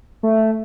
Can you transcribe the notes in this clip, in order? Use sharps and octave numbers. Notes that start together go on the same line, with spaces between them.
A3